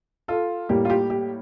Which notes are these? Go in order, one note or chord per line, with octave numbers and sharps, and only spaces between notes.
F4 A4
A2 G3 A#3 G4
F4
G4
G4